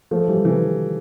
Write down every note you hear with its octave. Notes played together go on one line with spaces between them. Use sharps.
F3 A3
E3 G3
C3 E3